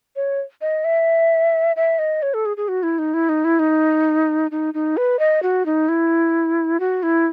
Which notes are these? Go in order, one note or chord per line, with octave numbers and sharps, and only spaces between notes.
C#5
D#5
E5
E5
D#5
C#5
A4
G#4
G#4
F#4
E4
D#4
E4
D#4
E4
D#4
D#4
D#4
B4
D#5
F#4
D#4
E4
F#4
E4